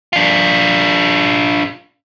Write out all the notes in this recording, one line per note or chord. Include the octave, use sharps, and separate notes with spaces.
D4 F4